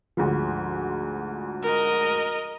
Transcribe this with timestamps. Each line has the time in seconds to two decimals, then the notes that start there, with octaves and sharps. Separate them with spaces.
0.17 D2 G#2 F3
1.63 A#4 D#5